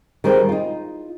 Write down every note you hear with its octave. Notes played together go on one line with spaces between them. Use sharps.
D#3 G3 C4 G#4 C5
D#4 F4